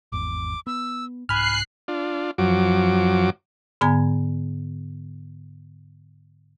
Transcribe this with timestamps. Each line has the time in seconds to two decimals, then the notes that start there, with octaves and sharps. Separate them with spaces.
0.12 G#1 E2 D6
0.67 B3 E6
1.29 C2 G#2 G#5 B5 F6 F#6 C7
1.88 D4 F4
2.38 F#2 F3 F#3 D6
3.81 G#2 D3 B3 G#5 A#5 G#6